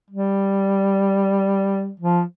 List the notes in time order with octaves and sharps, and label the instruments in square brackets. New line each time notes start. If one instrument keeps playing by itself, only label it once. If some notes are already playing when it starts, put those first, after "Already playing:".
[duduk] G3
F3